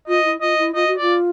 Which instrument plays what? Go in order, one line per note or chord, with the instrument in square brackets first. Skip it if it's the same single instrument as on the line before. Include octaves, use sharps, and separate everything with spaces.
[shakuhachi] F4 [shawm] D#5
[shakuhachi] E4
[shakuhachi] F4 [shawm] D#5
[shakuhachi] E4
[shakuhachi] F4 [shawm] D#5
[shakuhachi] F#4
[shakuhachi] F4 [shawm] D5